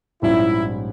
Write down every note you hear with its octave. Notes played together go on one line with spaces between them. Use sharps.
A#1 G#2 G3 C#4 E4